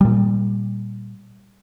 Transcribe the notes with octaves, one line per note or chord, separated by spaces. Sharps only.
A#2 G3